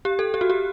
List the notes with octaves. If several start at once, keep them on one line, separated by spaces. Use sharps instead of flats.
G4
A4
G4
F#4
G4